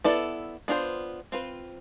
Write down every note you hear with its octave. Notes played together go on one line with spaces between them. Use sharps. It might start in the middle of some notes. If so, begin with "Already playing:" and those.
B3 E4 A4 D5
B3 D4 F4 C5
C4 F4 B4